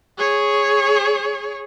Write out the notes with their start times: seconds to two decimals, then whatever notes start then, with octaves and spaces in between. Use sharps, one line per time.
0.17 G#4 C#5